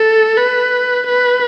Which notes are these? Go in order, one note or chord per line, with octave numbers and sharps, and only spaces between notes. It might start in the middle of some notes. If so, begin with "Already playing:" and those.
Already playing: A4
B4
B4